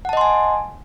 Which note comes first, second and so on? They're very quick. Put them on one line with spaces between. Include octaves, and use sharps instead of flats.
F#5 A5 D#5 C6 G#5